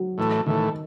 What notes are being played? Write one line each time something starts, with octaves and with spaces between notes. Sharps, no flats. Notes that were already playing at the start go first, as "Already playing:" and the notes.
Already playing: F#3
A2 E3 A3
A2 D#3 E3 A3